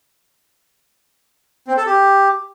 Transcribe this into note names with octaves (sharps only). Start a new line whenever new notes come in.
C4
A4
G4